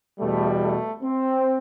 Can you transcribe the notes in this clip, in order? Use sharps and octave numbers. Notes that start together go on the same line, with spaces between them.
E2 B2 G3 A3
A3
C4